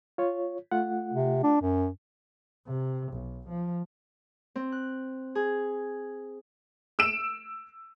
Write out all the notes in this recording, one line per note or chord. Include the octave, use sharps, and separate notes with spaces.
F4 C#5
A3 F4 F#5
C3
D4
F#2
C3
B1
F3
C4
F#6
G#4
E6 D7 E7